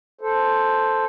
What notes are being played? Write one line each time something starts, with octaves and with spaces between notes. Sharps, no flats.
A4 C5